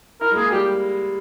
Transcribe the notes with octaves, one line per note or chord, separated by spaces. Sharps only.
E4 A#4
G#3
A#3 G#4
G3 G4